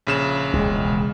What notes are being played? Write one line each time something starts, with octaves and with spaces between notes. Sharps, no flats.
A#1 C#3 E7
E1 C#2 G#3